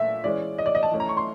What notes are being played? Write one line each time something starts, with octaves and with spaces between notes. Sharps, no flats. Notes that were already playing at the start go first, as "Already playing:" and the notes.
Already playing: A#2 A3 E5
E3 G#3 C#4 D5
D#5
D5
D#5
A5
E3 A3 C#4
A#5
C#6
C6